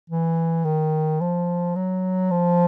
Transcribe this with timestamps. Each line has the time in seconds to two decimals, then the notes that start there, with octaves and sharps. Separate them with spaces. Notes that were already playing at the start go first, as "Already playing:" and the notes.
0.10 E3
0.65 D#3
1.21 F3
1.75 F#3
2.31 F3